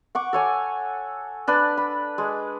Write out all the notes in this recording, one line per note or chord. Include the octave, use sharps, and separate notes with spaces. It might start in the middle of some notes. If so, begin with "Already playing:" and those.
F#5 C#6 D6
A4 C#5 G#5
D4 B4 A5
B5
G#3